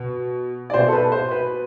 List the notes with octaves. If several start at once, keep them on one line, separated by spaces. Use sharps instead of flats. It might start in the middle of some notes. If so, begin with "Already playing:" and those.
Already playing: B2
D5
B2 C5
A4
B4
C5
B4